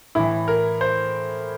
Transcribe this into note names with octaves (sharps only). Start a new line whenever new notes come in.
A2 E3 E4
A#4
C5